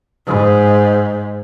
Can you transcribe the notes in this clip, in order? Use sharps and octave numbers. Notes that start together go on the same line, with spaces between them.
G#2